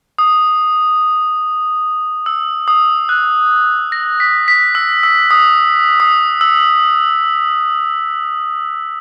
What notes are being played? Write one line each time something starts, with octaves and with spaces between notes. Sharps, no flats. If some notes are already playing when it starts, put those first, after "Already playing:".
D#6
E6
D#6
F#6
A#6
B6
B6
E6
E6
D#6
D#6
E6